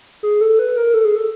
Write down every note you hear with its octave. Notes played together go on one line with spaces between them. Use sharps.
G#4
A4
B4
A#4
A4
G#4
A4